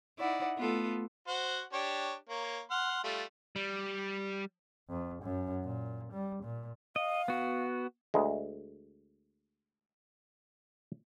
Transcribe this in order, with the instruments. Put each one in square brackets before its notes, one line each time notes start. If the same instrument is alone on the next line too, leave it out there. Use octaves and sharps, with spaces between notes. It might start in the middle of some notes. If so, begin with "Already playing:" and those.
[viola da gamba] D#4 E4 [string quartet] D5 F#5
[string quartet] A3 [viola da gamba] B3 F4 A4
[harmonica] F#4 C5 F#5
D4 G4 C#5
A#3 C#5
F#5 C6 F6
G3 A3 F4
[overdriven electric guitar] G3
[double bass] F2
F#2
A#2
G3
A#2
[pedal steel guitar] D#5 [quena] F5
[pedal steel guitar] B3 F#4
[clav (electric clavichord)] D2 G#3